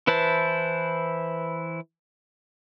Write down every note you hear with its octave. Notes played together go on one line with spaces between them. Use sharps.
E3 E4 B4 C5 A5